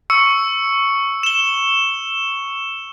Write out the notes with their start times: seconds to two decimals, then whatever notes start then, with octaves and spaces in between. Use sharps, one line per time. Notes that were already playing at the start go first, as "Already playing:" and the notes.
0.10 C#6 E6 C#7
1.23 E7 G7